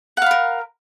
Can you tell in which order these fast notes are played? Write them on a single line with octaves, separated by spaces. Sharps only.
F#5 F5 B5 A#4